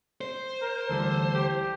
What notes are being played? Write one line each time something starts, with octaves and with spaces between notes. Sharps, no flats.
C5
A#4
D2 E3 G3 A4
G4